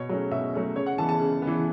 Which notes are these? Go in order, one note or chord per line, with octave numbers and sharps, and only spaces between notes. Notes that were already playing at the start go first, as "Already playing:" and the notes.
Already playing: B2 C#5
F#3 A3 C#4
B2 E5
F#3 A3 C#4
C#3 C#5
F#5
E3 B3 A5
A5
C#3
B3
E3